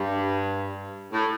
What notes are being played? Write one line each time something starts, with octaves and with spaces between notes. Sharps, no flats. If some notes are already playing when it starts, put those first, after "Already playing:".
Already playing: G2
A2